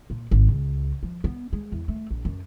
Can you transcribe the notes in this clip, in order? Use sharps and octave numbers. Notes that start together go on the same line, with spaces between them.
A#2
G#1
C#2
F3
B3
G#3
E2
A3
A#1
F#2